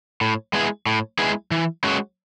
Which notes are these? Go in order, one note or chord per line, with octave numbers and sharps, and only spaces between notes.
A2
G#3 B3 E4 G#4
A2
G#3 B3 E4 G#4
E3
G#3 C#4 F#4